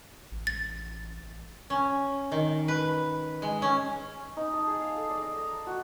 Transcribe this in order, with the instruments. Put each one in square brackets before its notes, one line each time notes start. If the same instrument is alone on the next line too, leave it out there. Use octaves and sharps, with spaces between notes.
[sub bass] A1
[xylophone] A6
[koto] C#4
D#3
B4
G#3
C#4
[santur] D#4
A5
G#4
F5
A4
D5
D#5
A#5
A5
F#4